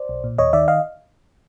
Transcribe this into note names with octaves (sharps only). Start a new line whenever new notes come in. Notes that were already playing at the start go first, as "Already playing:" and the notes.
Already playing: C5 D5
B1
A#2
D#2 C#5 D#5
D#3 D5 E5
D#5 F5